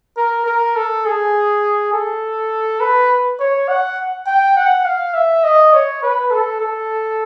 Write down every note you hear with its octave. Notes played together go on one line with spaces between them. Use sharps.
A#4
A#4
A4
G#4
A4
B4
C#5
F#5
G5
F#5
F5
E5
D#5
C#5
B4
A4
A4